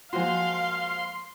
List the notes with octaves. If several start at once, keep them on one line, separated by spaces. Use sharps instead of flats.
F3 G#3 A#3 F#4 C5 F5 G#5 C6